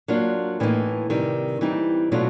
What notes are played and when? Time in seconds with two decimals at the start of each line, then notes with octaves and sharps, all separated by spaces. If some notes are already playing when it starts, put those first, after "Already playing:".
0.08 F#3 A#3 D4 F4
0.60 A2 E3 G3 A#3 D#4
1.10 C3 D#3 G3
1.61 E3 G3 C4 D#4
2.12 B2 F#3 A3 D4 F4